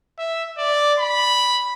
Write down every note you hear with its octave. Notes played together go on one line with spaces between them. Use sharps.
E5
D5
B5